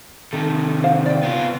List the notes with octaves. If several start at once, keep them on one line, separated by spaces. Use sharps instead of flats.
C3 D#3 A4
C5 F5 F#5
D5 G5
B3 F4